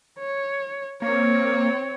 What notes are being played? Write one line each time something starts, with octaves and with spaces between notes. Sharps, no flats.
C#5
A#3 C4 C#5